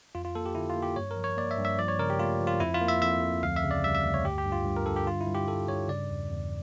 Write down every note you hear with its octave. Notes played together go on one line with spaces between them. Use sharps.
F2 F4
F4
A#3 A4
G4
D3 E4
F4
A#3
G4
G2 C#5
A#4
F3
C#5
A#3 D5
E5
G2
E5
F3 D5
C#5
C#3 A#4
G4
A3 F4
F3
F4
F2 E4
F4
A#3
E5
F2 E5
F2
D2 F5
E5
C#3
D5
G3 E5
E5
D2
C#5
G2 G4
G4
G2
F4
G2
A#4
D3 A4
G4
G2 F4
E4
G2
G4
G2 A4
G2 C#5
C#3 D5
E2
E2